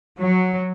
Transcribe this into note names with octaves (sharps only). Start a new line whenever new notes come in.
F#3